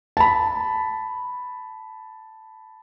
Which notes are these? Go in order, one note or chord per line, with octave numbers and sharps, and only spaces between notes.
A5 B5